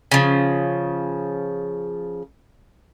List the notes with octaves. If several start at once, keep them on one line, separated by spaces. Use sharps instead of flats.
C#3 F3